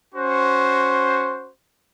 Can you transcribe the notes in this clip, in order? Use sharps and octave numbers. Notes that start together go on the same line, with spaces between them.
C#4 F#4 C5